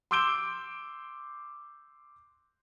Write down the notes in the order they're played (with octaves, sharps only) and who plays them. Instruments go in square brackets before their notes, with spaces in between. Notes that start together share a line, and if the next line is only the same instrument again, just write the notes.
[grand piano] C6 D6 E6 G6 D7 G7